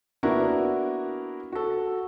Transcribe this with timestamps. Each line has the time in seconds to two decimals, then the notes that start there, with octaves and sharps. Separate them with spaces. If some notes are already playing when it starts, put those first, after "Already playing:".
0.23 A#3 B3 D4 E4 F#4 A#4
1.52 F#4 A4